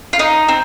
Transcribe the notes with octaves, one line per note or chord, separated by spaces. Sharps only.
F4
D#4
C4